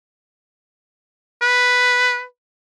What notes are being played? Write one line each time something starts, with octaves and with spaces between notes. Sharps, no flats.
B4